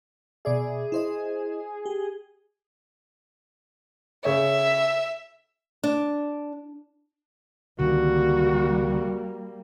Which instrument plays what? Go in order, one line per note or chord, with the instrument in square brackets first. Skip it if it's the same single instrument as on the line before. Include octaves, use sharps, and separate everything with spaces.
[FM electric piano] B2 D5 E5 [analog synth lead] G#4
[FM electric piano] E4 C5 D#5
G4
[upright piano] C#3 C#5 [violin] E5
[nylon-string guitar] D4
[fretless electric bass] C#2 D3 D#3 [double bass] G3 A#3 [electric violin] F#4